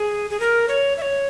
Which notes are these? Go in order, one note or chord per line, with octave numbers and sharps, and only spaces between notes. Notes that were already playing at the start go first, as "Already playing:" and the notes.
Already playing: G#4
G#4
A#4
C#5
E5
C#5